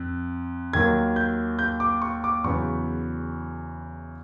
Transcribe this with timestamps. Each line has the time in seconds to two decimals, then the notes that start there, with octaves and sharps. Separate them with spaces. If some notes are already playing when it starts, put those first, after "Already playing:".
Already playing: F2
0.73 D#2 D#3 F#3 A#3 G#6
1.16 G6
1.59 G6
1.80 D6
2.02 C#6
2.24 D6
2.44 E2 C#3 F#3 B3 C#6